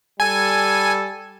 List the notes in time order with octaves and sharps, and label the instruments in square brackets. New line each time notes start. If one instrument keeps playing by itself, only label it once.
[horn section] G3 A4 [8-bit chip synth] G#5